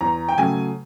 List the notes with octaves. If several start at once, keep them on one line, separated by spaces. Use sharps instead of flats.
E2 A#5
G5
C#3 F#3 A3 G#5